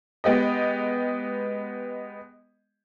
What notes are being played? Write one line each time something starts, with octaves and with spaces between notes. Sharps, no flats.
G#3 B3 G4 D#5